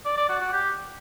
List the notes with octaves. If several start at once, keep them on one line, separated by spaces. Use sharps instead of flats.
D5
D5
F#4
F#4
G4